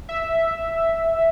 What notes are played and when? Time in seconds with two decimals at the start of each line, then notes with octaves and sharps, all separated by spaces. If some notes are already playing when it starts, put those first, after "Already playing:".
0.09 E5